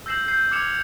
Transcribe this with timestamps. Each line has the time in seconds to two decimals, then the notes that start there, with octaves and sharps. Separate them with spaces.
0.06 E6 G6 A#6 C7 E7 F#7
0.28 E6 G6 C7
0.51 D6 F6 G#6 C#7 E7 F7